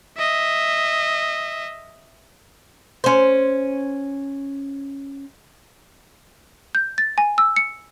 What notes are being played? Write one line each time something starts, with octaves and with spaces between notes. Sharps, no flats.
D#5 E5
C#4 C5
G6
A6
G#5
E6
C#7